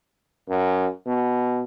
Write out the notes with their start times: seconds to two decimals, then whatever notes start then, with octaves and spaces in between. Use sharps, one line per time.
0.49 F#2
1.06 B2